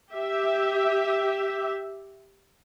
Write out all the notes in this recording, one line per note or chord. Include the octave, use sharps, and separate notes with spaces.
G4 E5